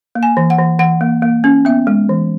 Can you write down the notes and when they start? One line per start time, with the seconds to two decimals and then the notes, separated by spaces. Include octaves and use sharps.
0.15 A#3
0.23 G#5
0.37 E3
0.50 F#5
0.59 E3
0.79 E3 F#5
1.01 A#3
1.22 A#3
1.44 C#4
1.65 B3 E5
1.87 G#3
2.09 E3